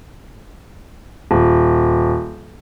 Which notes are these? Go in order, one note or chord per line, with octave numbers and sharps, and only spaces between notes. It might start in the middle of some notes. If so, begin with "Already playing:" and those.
D#1